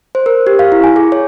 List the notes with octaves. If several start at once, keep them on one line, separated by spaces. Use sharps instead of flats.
C5
A#4
G4
F5
E4
G#5
G#4
C#5